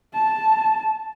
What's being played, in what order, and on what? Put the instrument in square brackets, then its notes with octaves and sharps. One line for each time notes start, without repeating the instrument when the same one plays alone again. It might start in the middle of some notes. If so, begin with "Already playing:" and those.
[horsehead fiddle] A5